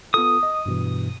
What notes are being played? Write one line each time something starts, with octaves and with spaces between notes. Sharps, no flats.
B3 F4 A4 D#6
D#5
G2 B2 E3